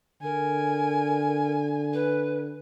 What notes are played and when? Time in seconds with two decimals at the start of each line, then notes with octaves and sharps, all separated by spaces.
0.23 D3 A#4 G#5
1.92 B4